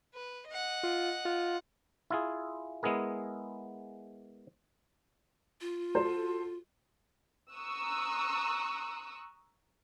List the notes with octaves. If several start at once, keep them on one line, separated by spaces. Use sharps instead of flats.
B4
D#5 F#5
F4
F4
E4 F4 G#4
G#3 B3 E4 G#4 A#4
F4
F#4 A4 C5
A#5 C#6 D#6 E6 F#6